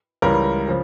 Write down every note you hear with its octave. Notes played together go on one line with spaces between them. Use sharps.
C#2 C#3 E3 G3 A#4
C#3 F3